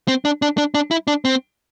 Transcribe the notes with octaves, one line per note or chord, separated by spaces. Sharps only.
C4
D4
D4
D4
D4
E4
D4
C4